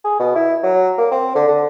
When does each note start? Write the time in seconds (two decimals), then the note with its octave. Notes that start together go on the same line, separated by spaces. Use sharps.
0.05 G#4
0.20 B2
0.35 E4
0.63 F#3
0.98 A#3
1.11 C4
1.35 D3
1.48 D3